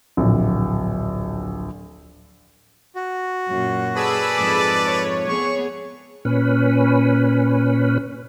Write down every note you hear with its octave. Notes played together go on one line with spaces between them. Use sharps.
D1 A#1
F#4
F#2 A#2
G#4 A4 B4 D5 B5 E6
F2 G#2 D6
C#5
B3 G#4 C#6
A#2 C#4 B4